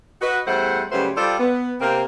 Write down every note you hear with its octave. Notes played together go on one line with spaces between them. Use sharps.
F#4 B4 D#5
E2 G3 A3 E4 C5 F#5
C#3 F#3 G3 A3 B4 C5
G3 F4 G4 A4 C5 D5
B3
C3 A#3 C4